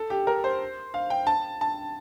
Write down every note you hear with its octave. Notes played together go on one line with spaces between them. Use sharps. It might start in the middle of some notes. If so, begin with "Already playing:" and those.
Already playing: A4
G4
A#4
C5
F5
G5
A5
A5